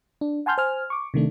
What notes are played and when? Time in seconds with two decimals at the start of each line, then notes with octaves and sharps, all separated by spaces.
0.21 D4
0.46 F#5 G#5 A5 C6 F6 G6
0.58 C5 G#5 F6
0.90 C#6 D6
1.14 C3 D#3 A3 D4